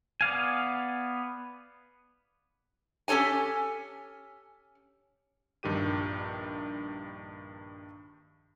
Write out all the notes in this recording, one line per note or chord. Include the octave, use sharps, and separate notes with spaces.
B3 D5 F5 G#5
C#4 G4 A4 C#5 G#5
A#1 G2 D#3 G4 D#7